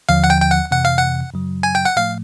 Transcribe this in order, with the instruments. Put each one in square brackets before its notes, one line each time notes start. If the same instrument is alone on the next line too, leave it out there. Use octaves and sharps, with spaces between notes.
[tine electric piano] D#2 D3 F3 [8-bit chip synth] F5
[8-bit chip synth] F#5
G5
G5
F#5
[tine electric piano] F2 C3 E3 [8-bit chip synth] F#5
[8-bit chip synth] F5
F#5
[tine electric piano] F#2 C#3 F#3
[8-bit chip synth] G#5
G5
F#5
[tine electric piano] A2 F3 A3 [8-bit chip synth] F5